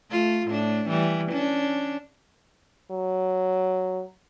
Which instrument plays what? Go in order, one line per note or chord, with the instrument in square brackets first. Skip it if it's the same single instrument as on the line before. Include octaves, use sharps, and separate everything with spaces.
[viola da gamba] A3 F4
A2 D4
E3 G3
C#4 D4
[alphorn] F#3